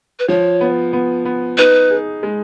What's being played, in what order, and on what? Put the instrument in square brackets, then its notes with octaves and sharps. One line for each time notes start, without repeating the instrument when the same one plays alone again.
[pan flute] B4
[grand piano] F3 [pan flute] C#5
[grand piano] B3
B3
B3
[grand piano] D#4 [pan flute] B4
[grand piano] G#4
G#3